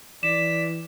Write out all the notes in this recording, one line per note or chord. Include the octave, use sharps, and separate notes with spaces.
E3 D5 B6 E7